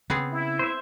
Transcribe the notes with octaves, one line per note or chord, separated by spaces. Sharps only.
C#3 B3 C4 G#4
E4
C5 E5